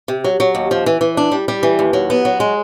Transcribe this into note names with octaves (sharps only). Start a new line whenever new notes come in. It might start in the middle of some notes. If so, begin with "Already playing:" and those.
C3
F#3
F#3
D#2
F3
E3
E3
D4
G3
G3
E3
D#2
F#3
B3
F#3
G#3